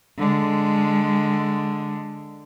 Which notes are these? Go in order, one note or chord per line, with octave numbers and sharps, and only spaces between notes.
D3 G#3